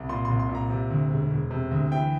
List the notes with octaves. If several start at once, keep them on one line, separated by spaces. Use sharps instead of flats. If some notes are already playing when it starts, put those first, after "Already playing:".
Already playing: C2
A#2 C6
C2 C6
C6
A#2
A#5
C3
D2
E1
E1
C3
D2
E3 G5